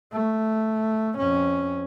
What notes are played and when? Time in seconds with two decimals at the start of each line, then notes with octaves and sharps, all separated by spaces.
0.13 A3
1.18 F2 C#4